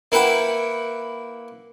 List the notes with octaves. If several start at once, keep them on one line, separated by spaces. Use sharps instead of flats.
A#3 E4 B4 F#5 G5